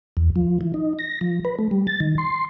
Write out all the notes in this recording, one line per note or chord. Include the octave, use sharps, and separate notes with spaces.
E2
F3
E3
D#4
A#6
F3
B4
A3
G3
A6
D#3
C6